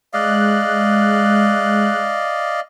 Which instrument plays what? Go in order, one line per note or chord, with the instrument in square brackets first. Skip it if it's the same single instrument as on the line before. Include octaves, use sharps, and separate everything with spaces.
[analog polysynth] G#3 F#6 [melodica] D5 D#5 F5